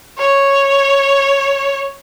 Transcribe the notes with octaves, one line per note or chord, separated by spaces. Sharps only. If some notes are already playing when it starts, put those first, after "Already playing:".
C#5